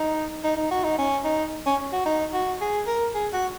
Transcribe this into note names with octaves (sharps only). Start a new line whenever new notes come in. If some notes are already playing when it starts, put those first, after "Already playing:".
Already playing: D#4
D#4
D#4
F#4
D#4
C#4
D#4
C#4
F#4
D#4
F#4
G#4
A#4
G#4
F#4